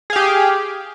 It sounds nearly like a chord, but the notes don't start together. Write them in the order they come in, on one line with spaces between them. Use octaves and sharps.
G#4 F5 G4